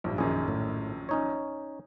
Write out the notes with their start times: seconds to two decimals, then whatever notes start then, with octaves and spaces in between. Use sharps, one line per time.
0.04 A#1 G2
0.18 A#1 F#2 D#3 G#4
0.48 A2
1.09 C#4 D#4 C#5